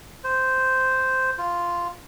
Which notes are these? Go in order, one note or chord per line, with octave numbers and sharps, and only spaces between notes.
C5
F4